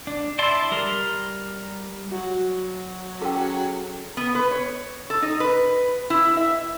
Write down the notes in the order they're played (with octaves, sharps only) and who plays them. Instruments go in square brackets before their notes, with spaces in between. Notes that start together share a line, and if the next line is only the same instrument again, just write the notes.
[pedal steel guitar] D4
E4 D5 E5 A5 C6
G3 A#4 C6
[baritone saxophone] F#3 [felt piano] F#4
[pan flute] C#4 [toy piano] G#4 G5 [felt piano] A4
[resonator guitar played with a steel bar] B3
B4
C#5
A4
D#4
B4
E4
E5